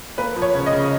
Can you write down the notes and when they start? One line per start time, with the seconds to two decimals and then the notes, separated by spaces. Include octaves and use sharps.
0.18 A#3 B4
0.36 F3
0.42 C#5
0.55 C#3
0.66 D#5
0.73 C#3